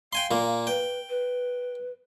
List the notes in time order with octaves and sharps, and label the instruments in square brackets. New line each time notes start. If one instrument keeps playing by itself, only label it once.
[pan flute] F5 [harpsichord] G5 G#5 C6
[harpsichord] A#2 A#3
[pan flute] B4 [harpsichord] G5
[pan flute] B4